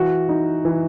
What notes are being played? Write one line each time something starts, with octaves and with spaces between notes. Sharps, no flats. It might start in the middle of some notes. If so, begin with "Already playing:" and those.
Already playing: E3 F#4
D#4
E3